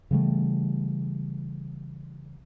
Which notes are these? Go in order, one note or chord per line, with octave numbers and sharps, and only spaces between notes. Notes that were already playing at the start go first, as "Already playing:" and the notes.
C#3 E3 G3 A3